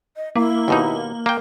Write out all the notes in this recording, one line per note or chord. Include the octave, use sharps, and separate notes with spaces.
D#5
A#3 E4
D#2 B2 D#4
A#3 A#4 G5